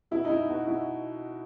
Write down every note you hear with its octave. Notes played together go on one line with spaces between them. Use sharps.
B2 E4
D#4
E4
B2 F#4
E4